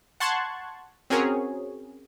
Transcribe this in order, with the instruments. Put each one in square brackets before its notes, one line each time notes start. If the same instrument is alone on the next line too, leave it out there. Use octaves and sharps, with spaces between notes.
[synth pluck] F#5 A5 C6 C#6 F#6 G#6
C4 C#4 F#4 G#4 A#4 C#5